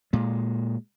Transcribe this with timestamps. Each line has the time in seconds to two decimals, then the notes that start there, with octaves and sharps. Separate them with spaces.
0.13 A#2 G#3